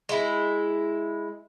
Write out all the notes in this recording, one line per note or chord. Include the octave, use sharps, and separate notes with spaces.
G#3 E4